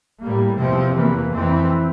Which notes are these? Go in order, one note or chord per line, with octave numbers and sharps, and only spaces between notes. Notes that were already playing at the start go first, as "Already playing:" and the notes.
A2 G3 A#3
E2 C3 F3 C4
E2 E3 A#3
F2 E3 A3 C4